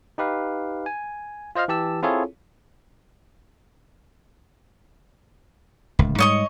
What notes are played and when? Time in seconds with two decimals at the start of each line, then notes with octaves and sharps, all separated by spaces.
0.18 D#4 G4 B4 F5
0.86 G#5
1.55 F4 C5 D#5 F5 F6
1.68 E3 G4 A5 E6
2.02 C4 E4 F4 G#4 A4 C#5
5.99 D1 C#2
6.19 G#2 G3 C#5 D#5 C#6